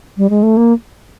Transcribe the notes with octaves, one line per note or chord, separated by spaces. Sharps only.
G3
G#3
A3
A#3